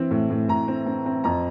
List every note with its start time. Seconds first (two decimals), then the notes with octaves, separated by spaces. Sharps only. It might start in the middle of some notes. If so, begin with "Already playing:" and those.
Already playing: E3 C4
0.11 A2
0.30 A2
0.48 A2 A#5
0.68 C4
0.86 C4
1.06 C4
1.24 F2 A#5